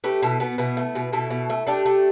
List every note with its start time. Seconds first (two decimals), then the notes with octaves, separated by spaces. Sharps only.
0.04 A3 G4 B4
0.22 B2 E4 A4
0.40 B2 B3
0.58 B2 B3 E4
0.77 A3
0.95 B2
1.13 B2 E4 A4
1.30 B2
1.50 A3
1.67 A3 D4 G4
1.86 A3